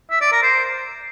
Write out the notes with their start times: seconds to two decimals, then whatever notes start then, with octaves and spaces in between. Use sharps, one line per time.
0.10 E5
0.21 D5
0.32 A#4
0.43 C5